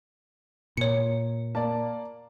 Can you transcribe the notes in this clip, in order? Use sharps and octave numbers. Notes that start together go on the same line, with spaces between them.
A#2 C#5 C#7
A#3 D5 A5